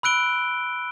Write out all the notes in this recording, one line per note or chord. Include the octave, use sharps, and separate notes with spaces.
B5 E6 F#6 D7 G7